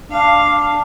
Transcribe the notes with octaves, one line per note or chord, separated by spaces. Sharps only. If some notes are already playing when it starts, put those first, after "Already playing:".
D4 F5